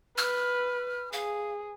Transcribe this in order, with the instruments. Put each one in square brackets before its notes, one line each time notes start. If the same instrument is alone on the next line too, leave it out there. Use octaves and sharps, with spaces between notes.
[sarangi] B4 [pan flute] F6
[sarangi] G#4 [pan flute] F5